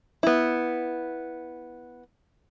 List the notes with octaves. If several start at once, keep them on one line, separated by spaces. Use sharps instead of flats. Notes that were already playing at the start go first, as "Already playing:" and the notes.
B3 E4